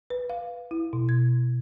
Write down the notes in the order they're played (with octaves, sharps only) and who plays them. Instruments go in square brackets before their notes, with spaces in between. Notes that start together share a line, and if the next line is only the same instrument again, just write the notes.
[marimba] B4
F5
E4
B2
G#6